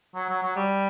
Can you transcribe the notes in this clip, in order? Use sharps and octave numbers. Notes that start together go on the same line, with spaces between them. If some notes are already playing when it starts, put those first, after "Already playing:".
F#3
F#3
F#3
G3